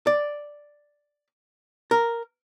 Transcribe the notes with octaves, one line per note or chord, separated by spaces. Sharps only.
D5
A#4